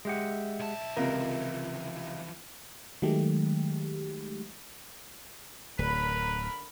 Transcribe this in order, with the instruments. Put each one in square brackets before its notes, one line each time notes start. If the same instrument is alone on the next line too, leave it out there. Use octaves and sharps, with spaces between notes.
[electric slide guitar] G#3 G4 F#5 [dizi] E5
[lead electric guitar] B1 A5
[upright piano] C#2 C3 [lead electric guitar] E3 F3 [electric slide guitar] A#4
[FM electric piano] D#3 F#3 G#3 A3 G4
[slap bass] D1 [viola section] D3 A#4 B5 [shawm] B4